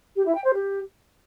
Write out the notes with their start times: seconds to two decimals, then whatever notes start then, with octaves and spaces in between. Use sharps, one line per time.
0.16 G4
0.26 E4
0.35 G5
0.44 C5
0.54 G4